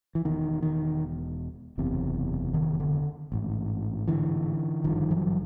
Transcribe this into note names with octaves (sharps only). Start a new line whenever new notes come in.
E3
E1 E2 B2 D#3
D#3
F#1 E2 C3
D#3
D3
A1 G#2
D3 E3
G#1 G2 D3 D#3 F3
E3 F#3